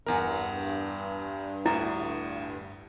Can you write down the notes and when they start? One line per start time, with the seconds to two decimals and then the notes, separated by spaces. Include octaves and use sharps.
0.06 E2 G2 A#4 F#5 G#5 A#5
1.66 D2 A2 E4